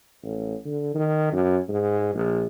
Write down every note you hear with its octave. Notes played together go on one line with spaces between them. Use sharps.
A1
D3
D#3
F#2
G#2
A#1